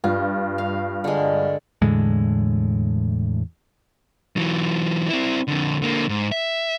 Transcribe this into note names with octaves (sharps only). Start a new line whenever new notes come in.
G2 F4
F5
D3 G#3
E2 A2 D3 G#3
E3 F#3
C4 E4
F2 D3
D3 A#3
G#2
E5